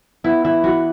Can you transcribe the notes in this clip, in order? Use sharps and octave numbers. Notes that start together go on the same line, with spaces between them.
B3 E4
E3 E4
E3 F#4